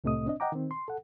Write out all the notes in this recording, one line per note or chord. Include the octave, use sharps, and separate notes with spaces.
C2 A2 C3 A3 D#5 D#6
C4 D4 D#5
D#5 F#5 G5 A#5 D6
D#3 C4
C6
A4 F#5